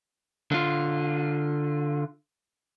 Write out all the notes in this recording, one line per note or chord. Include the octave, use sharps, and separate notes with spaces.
D3 F4